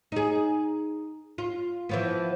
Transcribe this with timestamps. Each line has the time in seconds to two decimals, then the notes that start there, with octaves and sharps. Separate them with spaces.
0.12 D#4 G#4
1.38 F4
1.89 E3 F3 B3